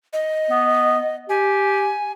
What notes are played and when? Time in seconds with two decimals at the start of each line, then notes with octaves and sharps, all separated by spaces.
0.13 D#5
0.50 B3
1.29 G4 G#5